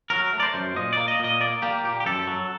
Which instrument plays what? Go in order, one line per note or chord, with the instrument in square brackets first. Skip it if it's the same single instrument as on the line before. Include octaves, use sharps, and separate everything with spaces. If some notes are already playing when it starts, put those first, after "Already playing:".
[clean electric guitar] F#3 A#4
A3
D5
C5
F#2
A#2 D#5
A#3 D5
D#5
A#2 D#5
A#3 D5
A#3 G4
A#2 G4
G4
F#2 A4
F#3